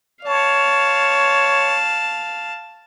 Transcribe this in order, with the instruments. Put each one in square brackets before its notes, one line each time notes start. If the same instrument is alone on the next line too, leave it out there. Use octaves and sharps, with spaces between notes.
[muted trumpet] C#5 [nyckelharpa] F5 A5